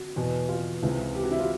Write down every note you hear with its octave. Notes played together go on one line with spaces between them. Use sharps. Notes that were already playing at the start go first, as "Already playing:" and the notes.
Already playing: F#4
E2 B2
F4
C#2 C3 E3
G4
F#4
E4
F4